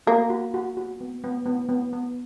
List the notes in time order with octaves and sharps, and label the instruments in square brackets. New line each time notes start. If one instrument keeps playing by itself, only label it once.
[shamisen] A#3 [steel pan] F#4
[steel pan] F#4
F#4
F#4
B3
B3
B3
B3
B3